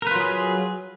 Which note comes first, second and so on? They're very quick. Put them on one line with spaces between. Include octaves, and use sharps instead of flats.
A#4 B4 F4 F#3 G#4